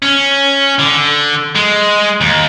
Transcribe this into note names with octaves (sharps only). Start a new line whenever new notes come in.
C#4
D3
G#3
D#2